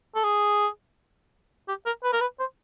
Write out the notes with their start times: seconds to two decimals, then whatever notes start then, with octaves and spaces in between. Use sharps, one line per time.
0.16 A4
0.24 G#4
1.68 G4
1.86 A#4
2.03 B4
2.13 A#4
2.21 B4
2.40 C5